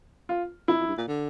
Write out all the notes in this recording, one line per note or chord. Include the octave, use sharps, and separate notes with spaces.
F4
F2 E4
F2
G2
A#2
D3